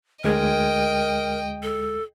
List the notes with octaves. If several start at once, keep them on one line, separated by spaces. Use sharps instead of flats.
D2 G#3 A#4 D#5 G5 G#6
A4